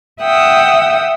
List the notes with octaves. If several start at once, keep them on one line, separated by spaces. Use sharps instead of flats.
E5 F#5 G5 D#6 E6